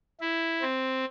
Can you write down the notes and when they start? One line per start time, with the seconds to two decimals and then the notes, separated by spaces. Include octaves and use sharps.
0.20 E4
0.61 C4